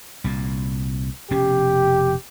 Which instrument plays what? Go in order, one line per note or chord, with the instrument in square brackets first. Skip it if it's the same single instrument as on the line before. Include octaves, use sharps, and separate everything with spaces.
[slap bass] C2 A#2
[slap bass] F1 B2 C#4 [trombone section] G4